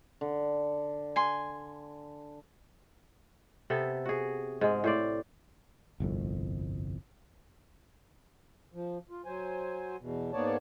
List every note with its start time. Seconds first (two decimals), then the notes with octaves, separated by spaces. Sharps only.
0.21 D3
1.16 G#5 C6
3.70 C3 B3 A4
4.05 F#4 G#4
4.61 G#2 G#3
4.84 A2 C5 D5
6.00 G1 C2 F2
8.73 F3
9.10 F4
9.25 F#3 C5 G#5
10.00 E2 B2
10.33 G#2 A#3 B3 C#5 D5 A5